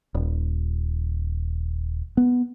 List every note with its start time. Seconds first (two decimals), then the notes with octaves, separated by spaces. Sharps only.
0.15 D#1
2.17 B3